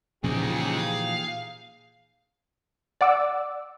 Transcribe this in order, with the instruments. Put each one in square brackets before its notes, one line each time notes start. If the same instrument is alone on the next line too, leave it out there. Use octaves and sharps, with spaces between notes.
[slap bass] A#2 E3 F3 [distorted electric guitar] C#3 G#3 [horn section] D#4 G4 G#4
[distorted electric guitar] F5
[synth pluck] D5 F#5 D6 E6